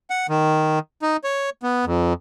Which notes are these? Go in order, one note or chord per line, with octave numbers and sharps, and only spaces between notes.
F#5
D#3
D#4
C#5
B3
F2